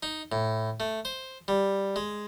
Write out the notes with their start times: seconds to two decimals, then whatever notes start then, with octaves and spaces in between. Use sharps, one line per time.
0.03 D#4
0.32 A2
0.80 A3
1.05 C5
1.48 G3
1.96 G#3